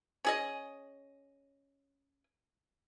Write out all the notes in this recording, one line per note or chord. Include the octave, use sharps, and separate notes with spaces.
C#4 G#4 D#5